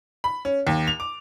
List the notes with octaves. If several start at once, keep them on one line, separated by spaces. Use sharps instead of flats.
B5
C#4
D#2
F7
D6